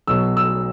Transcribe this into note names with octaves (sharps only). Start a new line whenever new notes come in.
B1 B2 F#3 E6
E6